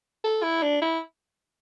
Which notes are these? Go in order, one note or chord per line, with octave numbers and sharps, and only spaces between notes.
A4
E4
D4
E4